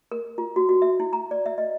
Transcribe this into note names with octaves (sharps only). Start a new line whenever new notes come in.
A#4
F4
F#4
F#4
E5
E4
A#5
D5
E5
D#5